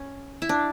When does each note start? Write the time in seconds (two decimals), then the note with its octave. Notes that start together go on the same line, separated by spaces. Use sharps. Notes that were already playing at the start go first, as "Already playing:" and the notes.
Already playing: C#4
0.42 E4
0.49 D4